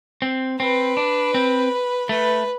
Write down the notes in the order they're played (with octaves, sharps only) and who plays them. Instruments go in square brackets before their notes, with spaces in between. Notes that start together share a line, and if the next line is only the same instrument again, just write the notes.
[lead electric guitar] C4
[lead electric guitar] C4 [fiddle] B4
[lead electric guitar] D4
C4
[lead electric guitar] A3 [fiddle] B4